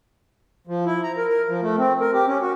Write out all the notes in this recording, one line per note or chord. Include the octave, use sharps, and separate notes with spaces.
F3
E4
A#5
A#4
A#4
F3
A3
C4
A#4
G4
C#4
F#4